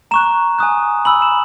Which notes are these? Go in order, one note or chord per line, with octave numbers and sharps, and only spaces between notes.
A#5 C#6 F#6 E7
G#5 D#6 F#6
G#5 B5 E6 F#7
E7